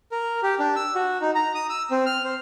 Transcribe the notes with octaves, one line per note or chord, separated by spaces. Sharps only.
A#4
G4
D4
E6
F#4
D#4
A#5
D#6
E6
C4
F6
C5